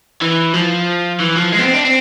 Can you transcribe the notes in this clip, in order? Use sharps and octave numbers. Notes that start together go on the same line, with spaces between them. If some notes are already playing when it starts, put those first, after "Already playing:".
E3
F3
E3
F3
G#3
B3
C4
D4
C4